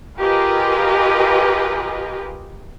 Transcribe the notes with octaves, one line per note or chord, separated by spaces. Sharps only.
F4 G4 G#4 A#4 B4 D#5